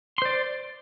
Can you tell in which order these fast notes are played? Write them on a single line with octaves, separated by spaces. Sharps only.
C6 C5 D5